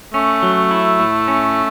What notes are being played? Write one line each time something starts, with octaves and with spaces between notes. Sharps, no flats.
A3 C#4
F#3
E4
A2
C#4